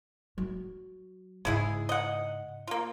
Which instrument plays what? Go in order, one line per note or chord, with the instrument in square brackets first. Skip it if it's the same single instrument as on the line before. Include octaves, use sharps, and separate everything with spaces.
[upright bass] F#3
[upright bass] G#2 C#3 [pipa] G#3 E4 G#4
[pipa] D#5 F#5
A#3 F4